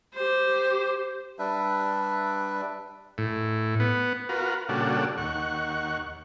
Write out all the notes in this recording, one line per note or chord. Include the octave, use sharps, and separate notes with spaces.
G4 C5
G3 D4 B4 E5
A2
B3
F4 F#4 A#4 B4
A#2 C#3 G3 D4 F#4 A4
D#2 F#5 C#6